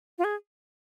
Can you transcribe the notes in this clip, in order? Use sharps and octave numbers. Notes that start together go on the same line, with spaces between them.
F4
G#4